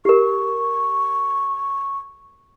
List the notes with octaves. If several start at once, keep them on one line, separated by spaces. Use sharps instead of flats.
G4 A#4 C#6